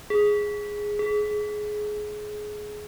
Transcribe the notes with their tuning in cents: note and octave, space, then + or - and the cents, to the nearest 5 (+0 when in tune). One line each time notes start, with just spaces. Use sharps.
G#4 +0
G#4 +20